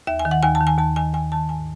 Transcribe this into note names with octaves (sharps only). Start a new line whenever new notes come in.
D#2 E5
G#5
D#3
F#5
D#2 G#5
A5
D#3
G#5
D#2 A5
D#3 G#5
D#2 G#5
D#3 A5
G#2 G#5